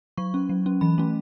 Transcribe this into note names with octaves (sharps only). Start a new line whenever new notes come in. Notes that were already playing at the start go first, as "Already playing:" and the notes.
F#3 C#6
C#4
F#3
C#4
E3 B5
A3 C#4